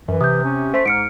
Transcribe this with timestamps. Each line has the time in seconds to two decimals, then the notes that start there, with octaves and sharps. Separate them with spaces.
0.08 F#2 E3
0.21 C3 D#6 G6
0.44 C#4
0.74 A3 C5 C6 B6
0.86 G#2 F6 C#7 D7